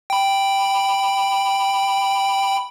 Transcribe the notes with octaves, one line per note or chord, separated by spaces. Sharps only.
G5 B5